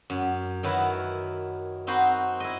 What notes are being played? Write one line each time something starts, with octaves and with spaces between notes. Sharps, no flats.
F#2
D#3 F#3 E4 B4
C4 D#4 F#4 C5 B5
E4 D#5